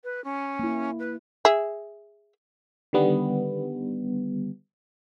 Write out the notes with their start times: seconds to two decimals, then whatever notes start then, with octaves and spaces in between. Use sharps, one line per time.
0.04 B4
0.24 C#4
0.59 A#3 E4
0.99 B4
1.45 G#4 E5
2.93 D3 D#3 G3 B3